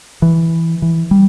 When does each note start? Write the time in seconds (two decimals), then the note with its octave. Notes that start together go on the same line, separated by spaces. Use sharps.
0.22 E3
0.82 E3
1.11 G3